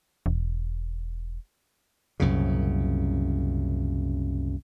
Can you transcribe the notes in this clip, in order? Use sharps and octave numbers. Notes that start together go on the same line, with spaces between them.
E1
C2 F#2 A#2 C#3